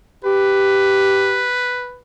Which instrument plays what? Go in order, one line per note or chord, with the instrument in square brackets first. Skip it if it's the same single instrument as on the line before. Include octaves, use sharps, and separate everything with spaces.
[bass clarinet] G4 [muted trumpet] B4